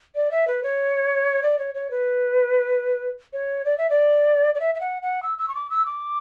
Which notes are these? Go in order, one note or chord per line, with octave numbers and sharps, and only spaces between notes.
D5
E5
B4
C#5
D5
C#5
C#5
B4
C#5
D5
E5
D5
D5
E5
E5
F#5
F#5
E6
E6
C#6
D6
E6
D6